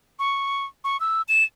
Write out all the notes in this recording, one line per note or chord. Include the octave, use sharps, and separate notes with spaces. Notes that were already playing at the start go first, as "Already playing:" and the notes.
C#6
C#6
E6
E7